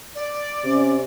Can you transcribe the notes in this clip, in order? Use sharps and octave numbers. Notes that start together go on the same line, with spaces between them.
D5
C3 C#4